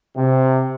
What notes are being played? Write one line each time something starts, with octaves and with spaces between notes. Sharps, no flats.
C3